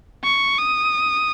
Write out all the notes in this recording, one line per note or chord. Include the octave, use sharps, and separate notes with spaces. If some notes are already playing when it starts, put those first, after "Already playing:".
C#6
D#6